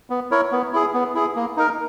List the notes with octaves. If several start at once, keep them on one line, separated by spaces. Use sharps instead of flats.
B3
E4 A#4 C#5
B3
E4 G#4
B3
E4 G#4
A#3
D#4 A#4